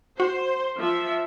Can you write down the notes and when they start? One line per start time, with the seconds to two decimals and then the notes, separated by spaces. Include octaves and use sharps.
0.20 F#4 C5
0.79 F3 E5